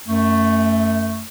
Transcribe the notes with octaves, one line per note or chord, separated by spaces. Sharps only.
F#2 A3